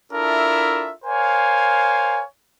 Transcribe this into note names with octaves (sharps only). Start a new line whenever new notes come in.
D4 E4 F4 A4 A#4 E5
A#4 C5 C#5 F5 G#5